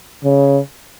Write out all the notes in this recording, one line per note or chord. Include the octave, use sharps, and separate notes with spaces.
C#3